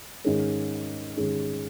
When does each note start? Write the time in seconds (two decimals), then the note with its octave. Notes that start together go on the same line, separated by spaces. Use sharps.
0.24 G#2 D#3 C#4 G#4
1.17 G#2 D#3 C#4 G#4